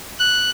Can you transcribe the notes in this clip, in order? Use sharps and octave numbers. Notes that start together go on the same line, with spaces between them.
F#6